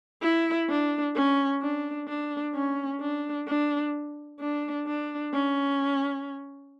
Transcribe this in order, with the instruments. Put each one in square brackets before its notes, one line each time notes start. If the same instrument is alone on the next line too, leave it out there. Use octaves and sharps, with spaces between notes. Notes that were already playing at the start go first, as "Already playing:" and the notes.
[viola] E4
D4
C#4
D4
D4
C#4
D4
D4
D4
D4
C#4